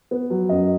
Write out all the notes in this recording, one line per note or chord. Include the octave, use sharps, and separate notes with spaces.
B3
F#3
F#2 D#5